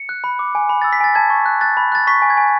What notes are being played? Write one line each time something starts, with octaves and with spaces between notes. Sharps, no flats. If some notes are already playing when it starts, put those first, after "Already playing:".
Already playing: C#7
F#6
B5
D6
G#5
B5
E6 A6
B6
G#5 A6
A5 G#6
C#6
F#6
F#6 A6
B5
F#6 A6
C#6 B6
G#5
G#6
G#5